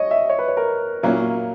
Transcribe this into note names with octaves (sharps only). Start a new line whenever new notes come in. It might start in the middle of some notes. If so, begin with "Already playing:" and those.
Already playing: C#5 D#5
E5
C#5
B4
C#5
A#4
A#2 F#3 A#3 C#4 E4 A#4